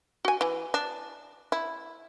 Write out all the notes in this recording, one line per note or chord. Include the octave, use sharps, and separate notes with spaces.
F#4 G#5
E3
D4
E4